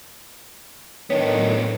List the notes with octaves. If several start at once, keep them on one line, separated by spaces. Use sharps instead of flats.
A2 D#3 F#3 A3 B3 D4 C#5